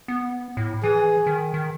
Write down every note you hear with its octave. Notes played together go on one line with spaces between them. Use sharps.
B3
A2
E3 G#4
D#3
D#3